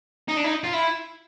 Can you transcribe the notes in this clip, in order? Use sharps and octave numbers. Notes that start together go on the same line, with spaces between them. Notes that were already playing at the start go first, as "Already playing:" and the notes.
D#4
D4
D#4
F4
E4